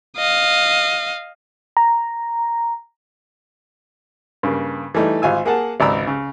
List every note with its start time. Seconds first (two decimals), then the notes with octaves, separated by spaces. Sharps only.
0.17 D#5 F5
1.77 A#5
4.43 G2 C#3 A#3
4.95 E3 G3 A3 D#4
5.22 G#1 F4 G#5 E6
5.45 A#3 G#4 F#5 A5
5.80 G#1 C#2 D5 A#5 B5 E6
6.07 C#3